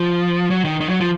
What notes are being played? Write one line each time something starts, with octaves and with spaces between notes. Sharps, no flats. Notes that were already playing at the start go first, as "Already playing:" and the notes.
Already playing: F3
F#3
D#3
D#3
F#3
F3